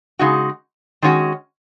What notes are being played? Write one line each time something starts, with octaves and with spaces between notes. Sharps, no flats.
C#3 G#3 D#4 F#4
D#3 G#3 C#4 F#4